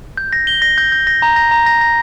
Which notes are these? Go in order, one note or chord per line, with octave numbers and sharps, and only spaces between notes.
G6
A#6
G7
A#6
G6
G6
A#6
A#5
A#6
A#5
A#6
A#6